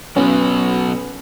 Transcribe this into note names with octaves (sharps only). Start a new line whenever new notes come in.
B2 F#3 B3 C#4 F#4 B4